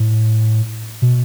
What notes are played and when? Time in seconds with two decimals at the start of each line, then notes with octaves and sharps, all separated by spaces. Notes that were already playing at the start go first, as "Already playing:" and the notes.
Already playing: A2
1.02 B2